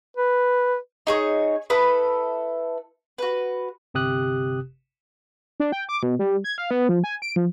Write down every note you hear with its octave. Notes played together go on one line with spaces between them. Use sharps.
B4
D#4 G#4 C#5
E4 A4 B4 D#6
F#4 B4
G1 C3 G4 D#6 F#6
D4
G5
D6
B2
G3
G#6
F5
B3
F3
G#5
D7
F3